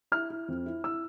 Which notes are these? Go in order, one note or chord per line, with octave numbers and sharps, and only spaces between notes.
E4 F6
E4
F2
E4
E4 E6